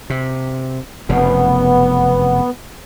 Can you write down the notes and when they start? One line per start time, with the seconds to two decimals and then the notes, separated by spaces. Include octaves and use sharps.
0.10 C3
1.09 F1 F#2 C#3 B3